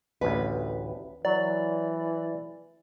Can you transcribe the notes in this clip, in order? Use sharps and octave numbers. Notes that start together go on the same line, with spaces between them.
A1 D2 B4
E3 F#3 D5